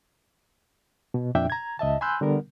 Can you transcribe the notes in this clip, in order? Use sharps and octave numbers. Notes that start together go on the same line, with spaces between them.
B2
F2 A#2 D4 E5 G5
A#5 G#6
C#2 D#5 E5 A5
G#5 B5 C6 E6 F#6 G6
D3 G3 B3 A#4